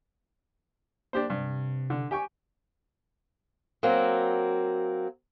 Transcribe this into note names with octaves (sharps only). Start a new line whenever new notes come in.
A#3 D4 G4 C5
G2 C3
D3
G4 G5 G#5 C#6
F#3 A#3 C4